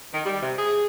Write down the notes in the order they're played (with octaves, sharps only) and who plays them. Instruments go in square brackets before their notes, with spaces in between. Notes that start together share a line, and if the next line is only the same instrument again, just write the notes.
[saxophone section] D#3
G3
C3
G#4